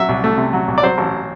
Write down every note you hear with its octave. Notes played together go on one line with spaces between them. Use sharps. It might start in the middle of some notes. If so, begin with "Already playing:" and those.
Already playing: F#3 E5
C2
A3
C3
F#3
C2
D5
F#3 C5
A1